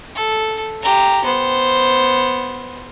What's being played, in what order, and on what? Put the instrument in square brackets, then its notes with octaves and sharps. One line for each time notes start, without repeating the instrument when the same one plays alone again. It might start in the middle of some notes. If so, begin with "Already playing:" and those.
[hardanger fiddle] A4
G4 A#5
B3 C5